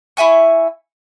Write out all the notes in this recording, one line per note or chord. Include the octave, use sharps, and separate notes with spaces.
E4 E5 G#5 C#6